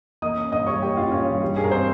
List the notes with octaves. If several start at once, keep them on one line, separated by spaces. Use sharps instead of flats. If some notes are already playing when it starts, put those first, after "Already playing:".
A#3 D#5 D#6
C#4
G2 D#5 D#6
G3 C#5 C#6
A#3 G4 G5
C#4 F4 F5
G2 C#4 C#5
G3
G3
G2 G#4
A#4
C4 C5